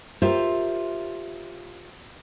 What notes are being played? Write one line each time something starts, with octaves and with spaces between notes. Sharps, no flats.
F4 G4 A#4 C5 E5